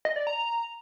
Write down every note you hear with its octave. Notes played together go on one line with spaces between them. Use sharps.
D#5
D5
A#5